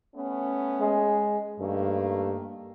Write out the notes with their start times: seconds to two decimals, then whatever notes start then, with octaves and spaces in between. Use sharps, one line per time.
0.15 A3 B3 C#4
0.81 G#3
1.60 G2 D#3 A3 A#3